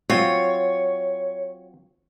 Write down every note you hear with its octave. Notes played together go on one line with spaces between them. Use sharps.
F#3 C4 F4 C#5